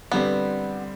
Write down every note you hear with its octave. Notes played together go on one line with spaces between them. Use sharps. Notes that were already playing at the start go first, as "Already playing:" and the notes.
D3 G3 B3 C4